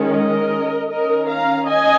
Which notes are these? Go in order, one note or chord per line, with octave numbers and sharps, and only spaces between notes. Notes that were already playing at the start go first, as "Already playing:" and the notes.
Already playing: D#3 G#3 C#4
A#4 D#5
D#3 C#4 A#4 D#5
F5 A#5
D#5 G#5